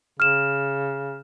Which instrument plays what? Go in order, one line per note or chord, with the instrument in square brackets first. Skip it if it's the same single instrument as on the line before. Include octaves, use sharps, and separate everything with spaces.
[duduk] C#3 [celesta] F6 E7